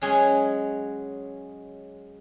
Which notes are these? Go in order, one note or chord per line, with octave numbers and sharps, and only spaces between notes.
F#3 G#3 C#4 G#4 C#5 G#5